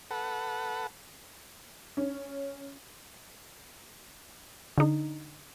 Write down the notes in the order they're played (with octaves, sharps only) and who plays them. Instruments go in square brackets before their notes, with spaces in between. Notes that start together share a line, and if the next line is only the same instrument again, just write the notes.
[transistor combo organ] A4 B4 F#5
[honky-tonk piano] C#4
[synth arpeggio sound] D3 D#4